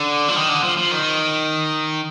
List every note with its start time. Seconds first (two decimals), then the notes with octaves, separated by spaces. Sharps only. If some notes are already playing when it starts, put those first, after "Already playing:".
Already playing: D3
0.28 F3
0.36 D#3
0.49 D3
0.63 F3
0.77 F3
0.91 D#3